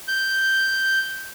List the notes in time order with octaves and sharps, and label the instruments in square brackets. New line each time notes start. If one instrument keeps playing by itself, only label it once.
[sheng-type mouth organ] G6